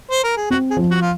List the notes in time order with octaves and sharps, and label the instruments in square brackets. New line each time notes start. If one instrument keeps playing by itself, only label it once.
[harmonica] C5
A#4
G#4
[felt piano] C4 [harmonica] F#4
[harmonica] G#4
[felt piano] F3
[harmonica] F#4
F4